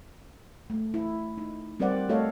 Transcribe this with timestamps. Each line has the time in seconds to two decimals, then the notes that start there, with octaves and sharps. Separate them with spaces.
0.70 A3
0.94 E4
1.38 D#4
1.80 G3 C4 A#4 C5 D5 F#5
2.09 A3 F#4 A4 C#5 D#5 F5